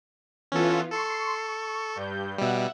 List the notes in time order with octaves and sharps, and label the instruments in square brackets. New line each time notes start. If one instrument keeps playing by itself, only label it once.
[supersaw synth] E3 B3 F4 [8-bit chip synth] C#4 A4
[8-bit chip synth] A4 [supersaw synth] C6 C#6 C7
[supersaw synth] C#6
G2 G6
[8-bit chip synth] B2 G3 [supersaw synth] E5 F#5